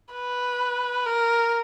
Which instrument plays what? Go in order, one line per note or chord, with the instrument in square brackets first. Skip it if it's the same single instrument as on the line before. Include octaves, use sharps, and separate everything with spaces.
[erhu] B4
A#4